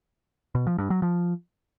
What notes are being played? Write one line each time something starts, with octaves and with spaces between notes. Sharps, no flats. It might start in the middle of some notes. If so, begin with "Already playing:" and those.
B2
F3
G2
F#3
F3